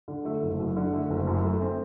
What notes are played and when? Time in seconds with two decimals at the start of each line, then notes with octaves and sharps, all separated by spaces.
0.08 D3
0.25 A3
0.42 F#1
0.60 F#2
0.77 D3
0.94 A3
1.10 F#1
1.27 F#2
1.44 A3
1.62 C4